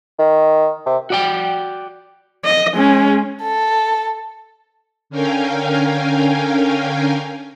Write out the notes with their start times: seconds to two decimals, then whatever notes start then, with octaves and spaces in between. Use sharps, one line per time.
0.19 D#3
0.86 C3
1.10 F#4 D5 G5
2.45 D#5
2.74 G#3 C#4
3.41 A4
5.10 D3 C#4 A#4 F5 G5 G#5